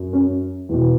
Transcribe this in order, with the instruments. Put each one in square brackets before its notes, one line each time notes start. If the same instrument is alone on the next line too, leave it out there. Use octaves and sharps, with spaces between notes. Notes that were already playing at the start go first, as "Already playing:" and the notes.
Already playing: [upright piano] F#2
C#4
E2 B2